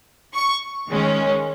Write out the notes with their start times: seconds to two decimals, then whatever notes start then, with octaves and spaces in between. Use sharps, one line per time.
0.34 C#6
0.90 D#3 G#3 C#4